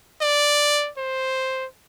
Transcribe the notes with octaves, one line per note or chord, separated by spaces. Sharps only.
D5
C5